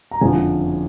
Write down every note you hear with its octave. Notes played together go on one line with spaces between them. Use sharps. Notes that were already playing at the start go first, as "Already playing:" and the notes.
A#5
F#1 F2 D3 F3 G#5